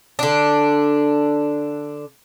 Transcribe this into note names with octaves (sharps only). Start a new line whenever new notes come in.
D3 D4